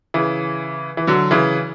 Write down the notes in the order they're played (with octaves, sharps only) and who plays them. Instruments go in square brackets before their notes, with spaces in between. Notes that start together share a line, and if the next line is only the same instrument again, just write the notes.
[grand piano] C#3 E3
E3
D3 F#3
C#3 E3